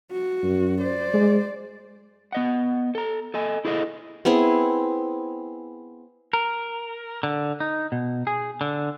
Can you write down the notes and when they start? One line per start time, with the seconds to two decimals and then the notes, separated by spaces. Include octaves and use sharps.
0.12 F#4
0.43 F#2
0.81 C5 D5
1.14 G#3
2.32 B3 D#5 F#5
2.95 A4 A#5
3.34 A4 D#5 G#5
3.65 E4 G#4 A4 D5 D#5
4.25 B3 C4 E4 G#4
6.33 A#4
7.23 D3
7.60 D#4
7.92 B2
8.27 G#4
8.61 D3